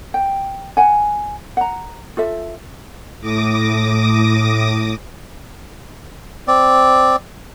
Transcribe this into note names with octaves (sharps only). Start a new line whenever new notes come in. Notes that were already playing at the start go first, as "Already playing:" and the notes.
G5
F#5 G#5
F#5 A#5
F4 A4 E5
A2 D6 D#6 A#6
C4 D5